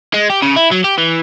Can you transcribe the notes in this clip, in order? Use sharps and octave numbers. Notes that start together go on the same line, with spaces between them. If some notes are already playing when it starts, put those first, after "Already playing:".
G#3
G4
C#3
E4
F#3
G4
E3